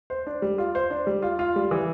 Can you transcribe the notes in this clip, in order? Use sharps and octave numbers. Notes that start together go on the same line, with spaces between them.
C5
D4
G3
F4
C5
D4
G3
F4
F4
G3
E3